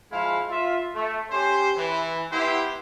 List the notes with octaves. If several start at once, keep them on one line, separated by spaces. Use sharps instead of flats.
F3 G#3 E4 F5
F4 E5
A3
C#4 G4 C5
E3
B3 E4 G4 C5